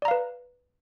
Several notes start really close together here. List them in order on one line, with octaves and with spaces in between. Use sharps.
D5 A#5 F5 B4